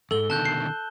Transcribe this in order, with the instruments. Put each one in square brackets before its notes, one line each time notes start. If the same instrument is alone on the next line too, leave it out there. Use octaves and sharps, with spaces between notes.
[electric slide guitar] E2 G#2 [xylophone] A4 [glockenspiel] E6 G7
[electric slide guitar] B2 D3 D#3 [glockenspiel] A5 F#6 G6
[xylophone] C7